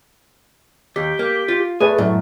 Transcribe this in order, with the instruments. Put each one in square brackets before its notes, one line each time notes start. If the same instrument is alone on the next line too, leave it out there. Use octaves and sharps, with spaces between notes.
[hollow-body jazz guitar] D#2 [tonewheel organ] G4
[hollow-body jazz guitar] A#3
F4
[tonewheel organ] A3 [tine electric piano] G#4 B4 D5 [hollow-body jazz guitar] G#5
[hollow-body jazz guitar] F#2 [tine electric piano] A2